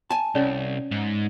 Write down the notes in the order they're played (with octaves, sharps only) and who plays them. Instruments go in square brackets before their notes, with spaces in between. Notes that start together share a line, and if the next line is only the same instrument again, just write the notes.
[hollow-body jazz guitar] G#5 A5
[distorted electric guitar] C2 [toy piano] C#4 C#5 D5
[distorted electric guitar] G#2